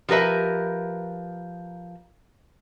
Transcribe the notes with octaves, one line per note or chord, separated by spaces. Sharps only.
F3 G4 A#4 B4 E5